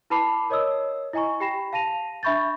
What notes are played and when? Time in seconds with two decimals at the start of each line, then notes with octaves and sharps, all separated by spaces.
0.10 E4 B4 A5 B5 D6 C7
0.50 A#4 C#5 D#5 D#6 E6
1.13 E4 D#5 G#5 A#5 C#6
1.40 G4 G5 B5 A#6 C7 E7
1.73 F5 A5 A#6 D#7 F7
2.23 D4 E5 B5 C#6 G6 A6